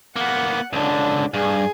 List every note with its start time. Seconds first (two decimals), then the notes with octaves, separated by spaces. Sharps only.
0.16 A#3 B3 F#5
0.73 C#2 D3 D4
1.34 G2 G#4